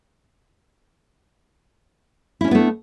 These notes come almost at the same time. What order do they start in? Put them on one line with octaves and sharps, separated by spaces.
E4 C#4 D4 B3 A3